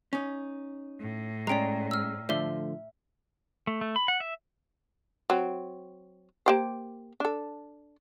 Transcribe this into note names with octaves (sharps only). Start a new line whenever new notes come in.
C#4 D#4
A2
G#3 C#4 D5 G5 A#5
E6 F6
D3 F3 A3 E5 G7
A3
A3
B5
F#5
E5
F#3 C4
A#3 G4 C5
D4 A4